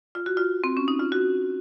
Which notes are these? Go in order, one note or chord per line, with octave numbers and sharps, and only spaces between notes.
F4
F#4
F4
C4
C#4
D#4
F4
F#4